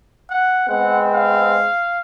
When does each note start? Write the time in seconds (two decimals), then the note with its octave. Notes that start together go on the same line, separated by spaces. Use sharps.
0.30 F#5
0.68 G#3 B3 C4 F#5
1.14 F5